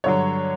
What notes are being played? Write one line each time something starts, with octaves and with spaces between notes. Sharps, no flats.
G2 D3 F#3 C#5